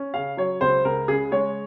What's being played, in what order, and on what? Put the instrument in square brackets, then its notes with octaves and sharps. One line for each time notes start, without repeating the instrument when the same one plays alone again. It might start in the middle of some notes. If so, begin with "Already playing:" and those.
Already playing: [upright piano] C#4
C#3 F5
F#3 C#5
C#2 C5
C#2 A#4
C#3 G#4
G#3 C#5